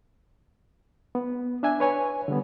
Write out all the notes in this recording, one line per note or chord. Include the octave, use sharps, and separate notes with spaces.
B3
D4 E5 G#5
B4 C#5 G#5
D3 G3 B3